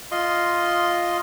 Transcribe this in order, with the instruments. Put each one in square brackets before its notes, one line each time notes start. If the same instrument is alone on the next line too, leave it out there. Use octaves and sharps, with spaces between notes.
[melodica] F4 D#5 C6